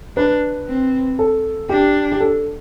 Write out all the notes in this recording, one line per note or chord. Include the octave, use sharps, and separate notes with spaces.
D4 B4
C4
A4
D4 G4
G4
A4